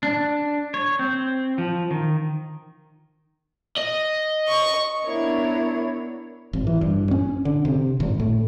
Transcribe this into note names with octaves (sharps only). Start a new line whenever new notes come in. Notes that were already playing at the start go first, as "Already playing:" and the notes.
D4
C#5
C4
F3
D#3
D#5
C#6
B3 D4 E4 A#4 C#5
G#1
E3
G2
C#4
D3
C3
G#1
A2